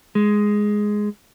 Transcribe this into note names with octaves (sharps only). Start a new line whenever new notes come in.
G#3